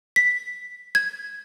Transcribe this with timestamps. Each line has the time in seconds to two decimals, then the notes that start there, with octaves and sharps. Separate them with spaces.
0.16 B6
0.95 G#6